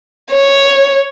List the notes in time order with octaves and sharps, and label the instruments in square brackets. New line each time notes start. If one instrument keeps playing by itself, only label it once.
[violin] C#5